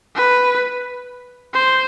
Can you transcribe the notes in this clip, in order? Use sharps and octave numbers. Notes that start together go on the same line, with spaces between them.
B4
C5